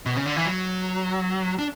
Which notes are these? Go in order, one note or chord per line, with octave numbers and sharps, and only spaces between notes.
B2
C#3
D3
E3
F#3
D4